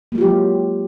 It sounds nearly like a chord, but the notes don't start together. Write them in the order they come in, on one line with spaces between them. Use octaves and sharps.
A#3 G#3 F4 G4 F#3